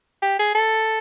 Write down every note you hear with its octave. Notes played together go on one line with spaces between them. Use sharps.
G4
G#4
A4